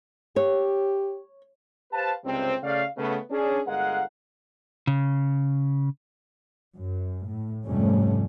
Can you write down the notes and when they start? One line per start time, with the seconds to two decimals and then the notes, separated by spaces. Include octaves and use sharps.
0.36 G4 C#5
1.93 G4 B4 C5 F5 A5
2.25 C#2 G2 C3 C4
2.63 C#3 A3 D5 F5
2.97 C#3 A3 B3
3.30 C#4 D4 G#4
3.67 G1 G#3 A#4 F5 F#5
4.87 C#3
6.76 F#2
7.27 A2
7.66 F2 G#2 C3 G3 A3 C#4